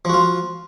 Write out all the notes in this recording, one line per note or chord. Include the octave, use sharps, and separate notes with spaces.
F3 F4 F#4